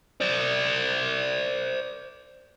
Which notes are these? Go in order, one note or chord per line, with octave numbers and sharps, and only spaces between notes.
C5 D5